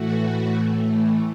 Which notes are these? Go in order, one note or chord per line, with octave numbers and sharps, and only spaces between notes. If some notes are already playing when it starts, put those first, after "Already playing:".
Already playing: A2 E3 A3 F#4